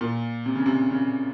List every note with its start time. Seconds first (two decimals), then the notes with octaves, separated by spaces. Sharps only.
0.01 A#2
0.46 C3
0.55 C#3
0.66 C3
0.91 C#3